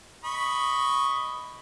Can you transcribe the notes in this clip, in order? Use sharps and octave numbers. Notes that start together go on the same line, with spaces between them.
D#5 B5 C#6